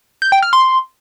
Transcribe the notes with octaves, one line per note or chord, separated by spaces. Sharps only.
G6
G5
F6
C6